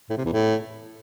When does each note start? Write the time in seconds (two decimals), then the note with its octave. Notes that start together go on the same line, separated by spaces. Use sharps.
0.10 A2
0.17 C3
0.25 E2
0.33 A2